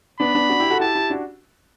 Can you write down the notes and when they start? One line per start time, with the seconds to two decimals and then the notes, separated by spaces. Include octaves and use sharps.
0.20 B3 D4 B5
0.35 B3 D4
0.49 D4 F#4
0.60 E4 G4
0.70 F#4 A4
0.80 E4 G4 A5
0.95 E4 G4
1.10 D4 F#4